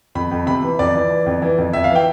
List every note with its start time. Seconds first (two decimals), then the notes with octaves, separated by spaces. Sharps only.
0.15 F2 B5
0.31 F2
0.47 C3 B5
0.62 E3
0.79 F2 D5
0.95 E3
1.10 E3
1.26 F2
1.42 E3
1.58 F2
1.73 F2 E5
1.84 F5
1.90 E3
1.95 G5